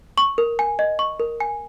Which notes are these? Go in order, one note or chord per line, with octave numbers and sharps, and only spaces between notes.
C#6
A#4
G#5
D#5
C#6
A#4
G#5